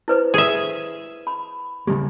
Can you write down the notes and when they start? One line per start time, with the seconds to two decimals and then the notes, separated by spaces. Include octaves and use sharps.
0.08 E4 B4 C5
0.34 G#4 E5
1.27 B5
1.87 C#3 G3 A#3 G4